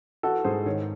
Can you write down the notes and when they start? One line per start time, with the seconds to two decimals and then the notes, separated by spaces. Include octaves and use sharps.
0.23 E3 F#4 A4
0.44 G#2 G#4 C5
0.66 D#3 C#5